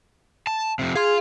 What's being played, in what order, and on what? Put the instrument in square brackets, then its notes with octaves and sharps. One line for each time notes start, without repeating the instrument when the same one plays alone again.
[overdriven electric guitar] A5
F2 C3
[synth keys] G#4 [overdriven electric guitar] F5 C6